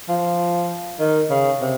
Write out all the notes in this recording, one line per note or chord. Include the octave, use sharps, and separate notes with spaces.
F3
D#3
C#3
C3